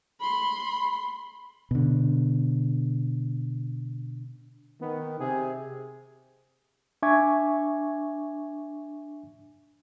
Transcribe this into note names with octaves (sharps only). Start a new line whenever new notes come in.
B5 C6
B2 D3
D#3 B3
C3 G#4
D4 E5 G#5 C#6 D6 G#6